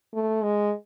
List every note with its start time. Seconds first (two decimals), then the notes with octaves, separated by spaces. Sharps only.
0.14 A3
0.42 G#3